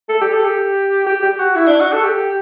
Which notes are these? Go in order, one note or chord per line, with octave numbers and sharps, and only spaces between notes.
A4
G4
A4
G4
G4
G4
F#4
E4
D4
F#4
A4
G4